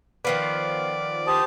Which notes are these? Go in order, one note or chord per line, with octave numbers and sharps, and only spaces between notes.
D#3 F3 B3 D5
G4 C5 A5 D#6